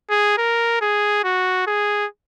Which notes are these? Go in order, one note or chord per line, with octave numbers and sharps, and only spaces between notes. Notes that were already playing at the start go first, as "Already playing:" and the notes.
G#4
A#4
G#4
F#4
G#4